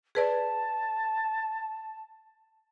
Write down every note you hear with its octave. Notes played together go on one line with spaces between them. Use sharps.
G#4 B4 D5 A5